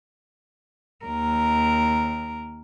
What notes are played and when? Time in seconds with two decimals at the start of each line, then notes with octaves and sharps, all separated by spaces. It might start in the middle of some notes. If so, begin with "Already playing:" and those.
1.05 D#2 A#4